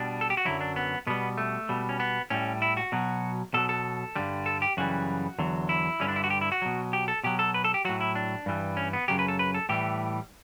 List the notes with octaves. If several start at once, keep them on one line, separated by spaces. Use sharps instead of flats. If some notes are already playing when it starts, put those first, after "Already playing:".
Already playing: B2 G3 D4
A4
G4
F#4
F#2 D3 F#3 E4
D4
B3
B2 G3 B3
A3
B2 G3
C#4
B3
A2 G3 C#4
E4
F#4
B2 F#3
B2 F#3 A4
A4
G2 D3 G3
A4
G4
F#2 C#3 E3 G3 F#4
E2 D3 F#3
E4
G2 D3 G3 C#4
D4
E4
F#4
G4
E4
F#4
B2 F#3
G4
A4
B2 F#3 G4
A4
B4
A4
G4
A2 F#3 F#4
E4
D4
G2 E3 G3
C#4
B3
F#2 C#3 F#3 G4
B4
A4
B4
A4
A2 E3 G3 G4